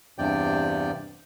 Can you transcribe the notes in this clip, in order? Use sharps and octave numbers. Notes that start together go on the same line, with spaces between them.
E2 G2 C3 D5 G5